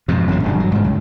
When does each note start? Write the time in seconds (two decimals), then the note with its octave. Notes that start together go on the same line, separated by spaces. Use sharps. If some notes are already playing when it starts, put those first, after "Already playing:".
0.08 F2 G#2 B2
0.27 A1 F#2 A#2 C#3
0.44 E1 G2 D3
0.60 F#3
0.72 G#2 C#3
0.84 C#2